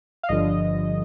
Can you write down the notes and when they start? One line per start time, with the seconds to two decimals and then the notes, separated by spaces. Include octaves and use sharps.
0.23 F5
0.29 G1 G2 D3 F3 D#5